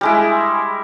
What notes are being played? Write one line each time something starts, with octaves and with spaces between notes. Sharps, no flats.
G3 G#3 E4